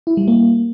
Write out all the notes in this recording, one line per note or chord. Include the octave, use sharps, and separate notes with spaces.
E4
G3
A#3